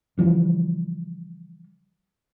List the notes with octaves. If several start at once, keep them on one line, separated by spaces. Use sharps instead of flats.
C#3 E3 F3 G3